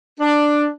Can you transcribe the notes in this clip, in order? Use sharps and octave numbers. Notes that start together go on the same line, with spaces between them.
D4